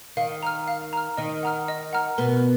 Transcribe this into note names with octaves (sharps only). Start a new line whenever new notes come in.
D#3 F5
A#5 F6
F5
A#5 F6
D#3 D#5
F#5 A#5 F6
D#5
F#5 A#5 F6
B2 B3 A#4